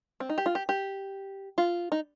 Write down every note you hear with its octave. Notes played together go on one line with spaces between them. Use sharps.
C4
D#4
G4
F4
G4
G4
F4
D#4